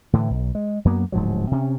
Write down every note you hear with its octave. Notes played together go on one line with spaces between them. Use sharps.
A2 D3 E3
B1
G#3
F#2 F#3 A#3 B3
D1 G#2 F3 F#3
C3 C#4